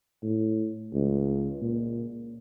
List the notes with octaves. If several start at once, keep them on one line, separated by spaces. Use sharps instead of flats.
A2
C#2
A#2